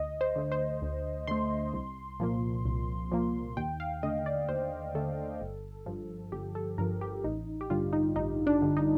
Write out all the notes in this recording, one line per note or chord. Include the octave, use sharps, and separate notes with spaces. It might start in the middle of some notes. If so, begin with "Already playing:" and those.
Already playing: D2 D#5
C5
D3 A3
C5
D2
D3 A3 C6
C2
A#2 F3 A#3
C2
A#2 F3 A#3
D#2 G5
F5
D3 A3 D#5
D5
D#2 C5
D3 A3 A4
G1
G2 F3
G1 G4
A4
G2 F3 A#4
G4
A1 D#4
G4
G2 D3 G3 F4
D#4
A1 D#4
D4
G2 D3 G3
D#4